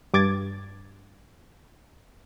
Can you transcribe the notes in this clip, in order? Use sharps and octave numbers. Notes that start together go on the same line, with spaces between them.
G2 D6 G#6 A6